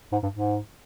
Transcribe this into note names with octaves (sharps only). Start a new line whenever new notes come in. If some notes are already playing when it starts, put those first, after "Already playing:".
G#2
G2
G#2